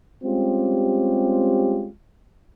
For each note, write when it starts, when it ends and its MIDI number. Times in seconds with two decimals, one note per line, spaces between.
0.24 1.89 55
0.24 1.89 56
0.24 1.89 60
0.24 1.89 61
0.24 1.89 65
0.24 1.89 67